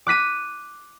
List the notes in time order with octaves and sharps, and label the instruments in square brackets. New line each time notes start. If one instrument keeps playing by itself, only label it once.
[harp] D6 F#6 B6 D#7